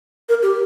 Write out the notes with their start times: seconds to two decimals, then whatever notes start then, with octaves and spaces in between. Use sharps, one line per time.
0.29 A#4
0.43 G4